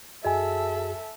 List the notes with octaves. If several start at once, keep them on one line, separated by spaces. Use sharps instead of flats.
F#2 F#4 G#4 A4 D#5 E5 G#5